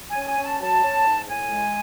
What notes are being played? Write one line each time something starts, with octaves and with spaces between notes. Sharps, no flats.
G#5
C#4
G#5
C#4
A5
F#3 A5
C#4
G#2
A2 G#5
G#3